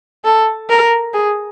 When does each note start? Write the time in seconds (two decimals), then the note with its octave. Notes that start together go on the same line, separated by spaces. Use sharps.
0.25 A4
0.69 A#4
1.14 G#4